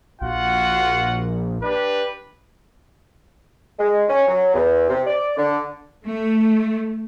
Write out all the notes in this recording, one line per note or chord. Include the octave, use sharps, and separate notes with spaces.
A#1 F4 F#4 F#5
D4 G4 B4
G#3
C#4
F#3
E2
C3
D5
D3
A3